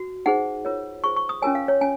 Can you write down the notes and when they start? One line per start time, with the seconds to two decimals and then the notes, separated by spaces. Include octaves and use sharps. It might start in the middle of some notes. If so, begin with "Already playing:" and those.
Already playing: F#4
0.26 D#4 G#4 C5 F#5
0.65 F4 A#4 C#5
1.04 F4 G#4 C5 C#6
1.16 C#6
1.29 D#6
1.42 C#4 F4 A#4 C#5 G#5
1.55 F5
1.68 C#5
1.81 C#4 G#5